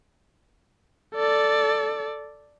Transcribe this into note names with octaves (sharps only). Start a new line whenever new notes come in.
A4 D5